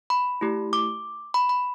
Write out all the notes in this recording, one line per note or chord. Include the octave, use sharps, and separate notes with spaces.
B5
A3 E4 G4
D6
B5
B5